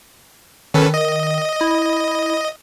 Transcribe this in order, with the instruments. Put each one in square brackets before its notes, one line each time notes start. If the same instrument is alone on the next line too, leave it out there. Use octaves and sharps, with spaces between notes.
[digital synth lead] D#3 [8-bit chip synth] C#4 A4 B4
[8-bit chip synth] D#5
[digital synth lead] E4